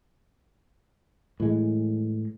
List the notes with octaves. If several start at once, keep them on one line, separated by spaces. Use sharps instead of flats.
A2 E3 G#3